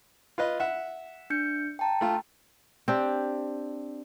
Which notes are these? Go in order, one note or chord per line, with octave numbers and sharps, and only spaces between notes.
F4 B4 D#5
E5 F#5
D4 G6 C#7
G5 A5 A#5
A3 F4
C4 D4 G4